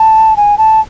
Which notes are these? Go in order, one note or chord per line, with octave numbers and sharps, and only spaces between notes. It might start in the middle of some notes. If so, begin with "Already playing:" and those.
Already playing: A5
G#5
A5